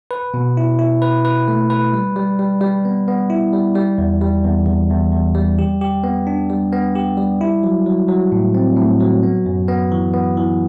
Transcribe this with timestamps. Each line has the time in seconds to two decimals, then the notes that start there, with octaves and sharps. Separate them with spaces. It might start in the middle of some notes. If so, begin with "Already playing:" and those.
0.11 B4
0.34 B2
0.57 E4
0.79 E4
1.02 B4
1.25 B4
1.48 A3
1.70 B4
1.94 G3
2.16 G3
2.39 G3
2.61 G3
2.85 B3
3.08 B3
3.30 E4
3.53 G3
3.75 G3
3.98 E2
4.21 G3
4.44 E2
4.67 E2
4.90 E2
5.13 E2
5.35 G3
5.59 G4
5.81 G4
6.04 B3
6.27 D4
6.50 G3
6.73 B3
6.95 G4
7.17 G3
7.41 E4
7.63 F#3
7.86 F#3
8.08 F#3
8.32 A2
8.55 C4
8.77 A2
9.00 F#3
9.23 B3
9.46 F#2
9.68 B3
9.92 E3
10.14 B3
10.37 E3